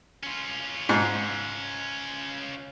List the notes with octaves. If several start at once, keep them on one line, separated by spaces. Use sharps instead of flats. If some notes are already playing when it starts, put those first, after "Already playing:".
C#4 F4
G#2